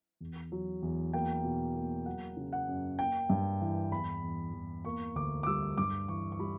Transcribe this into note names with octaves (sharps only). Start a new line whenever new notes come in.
E2
F#3
E2
A#3 G5
B2
A#3
F#3 F#5
C#3
F#5
F#2
A#3 G5
G2
E3
E2 B5
E2
E2
A#3 C#6
D2 D6
D6
G3 E6
G2 D6
E3 C#6
C#6
G3 B5